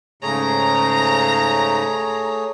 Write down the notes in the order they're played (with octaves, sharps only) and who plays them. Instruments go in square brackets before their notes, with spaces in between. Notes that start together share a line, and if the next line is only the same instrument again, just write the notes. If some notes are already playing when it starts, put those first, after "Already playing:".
[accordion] G#2 C#3 [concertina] A3 G#4 C#5 [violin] A#5